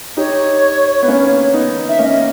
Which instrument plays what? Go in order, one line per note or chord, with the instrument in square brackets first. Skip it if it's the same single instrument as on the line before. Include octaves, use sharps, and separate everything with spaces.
[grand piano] D#4 G4 [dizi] C#5
[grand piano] B3
A#3 C#4
B3 D#4
[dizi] E5
[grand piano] A#3 C#4 [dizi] E5
[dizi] D#5